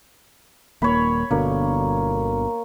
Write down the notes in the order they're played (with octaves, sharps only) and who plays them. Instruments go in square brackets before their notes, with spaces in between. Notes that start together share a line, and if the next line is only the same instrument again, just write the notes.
[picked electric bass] D#1 A#3 [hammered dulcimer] C#5 B5
[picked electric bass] G1 B2 D3 [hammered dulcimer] A#3